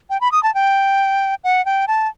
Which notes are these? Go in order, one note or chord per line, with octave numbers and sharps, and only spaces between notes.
G5
B5
D#6
A5
G5
F#5
G5
A5